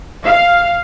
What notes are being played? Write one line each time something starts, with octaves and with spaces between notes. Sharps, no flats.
F5